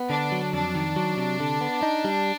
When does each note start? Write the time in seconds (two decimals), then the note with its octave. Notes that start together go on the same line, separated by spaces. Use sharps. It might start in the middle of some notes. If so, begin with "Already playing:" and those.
Already playing: B3
0.10 D3 D4
0.32 F#3
0.53 F2 D4
0.75 D#3
0.96 F#3
1.17 C3
1.40 D3
1.61 B3
1.83 D#4
2.05 G3